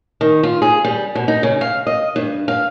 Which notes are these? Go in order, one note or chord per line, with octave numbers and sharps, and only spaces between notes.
D#3
F4
G#4
G3
B2
D#4
C#3
F5
D#5
G2
F5